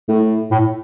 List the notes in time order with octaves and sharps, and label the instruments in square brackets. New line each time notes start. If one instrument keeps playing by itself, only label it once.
[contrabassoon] A2
[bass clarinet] A2